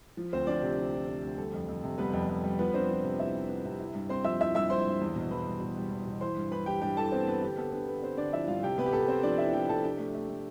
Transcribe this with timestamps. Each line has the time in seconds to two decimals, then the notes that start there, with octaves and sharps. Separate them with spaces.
0.17 F3
0.33 D2 C4 C5
0.47 F3 D4 D5
0.62 C3 G4
0.78 F3
0.93 F3
1.08 C4
1.23 D2
1.38 G3 A4
1.54 F2
1.68 F2
1.84 C3
1.98 G3 B3 B4
2.13 F2
2.29 F2
2.44 G3
2.59 F3 B3 B4
2.74 C4 D4 C5
2.89 F3
3.04 C3
3.19 C3 E4 E5
3.35 C3
3.49 B3
3.65 C3
3.80 E4
3.94 G2
4.09 C4 C5 C6
4.25 F3 E5 E6
4.40 E4 E5 E6
4.55 G2 E5 E6
4.70 E4 C5 C6
4.86 G2
5.01 E2
5.15 B2
5.31 E2 B4 B5
5.47 G3
5.61 B2
5.77 G3
5.91 E2
6.07 B2
6.21 E3 C5 C6
6.36 G2
6.52 E3 B4 B5
6.66 E3 G4 G5
6.81 G2 G4 G5
6.97 E3 A4 A5
7.12 B3 C4 C5
7.28 B3 B4
7.42 D3 G4
7.58 B3 A4
7.72 D3 B3 B4
7.88 B3 B4
8.02 B3 C4 C5
8.17 D3 D4 D5
8.33 F3 E4 E5
8.48 G2 F4 F5
8.63 C3 G4 G5
8.78 C3 B3 B4
8.86 G4
8.93 C3 A4
9.08 C4 C5
9.23 F3 D4 D5
9.38 C4 E4 E5
9.53 F3 G4 G5
9.69 C3 A4 A5
9.84 D4 G4 G5
9.99 A3
10.15 A3
10.29 A3